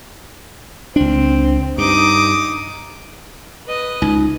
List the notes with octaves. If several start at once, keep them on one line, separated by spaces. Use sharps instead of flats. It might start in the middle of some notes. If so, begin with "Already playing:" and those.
C#2 C4 D4
G2 D#4 D6 D#6
B4 D#5
C#2 D#4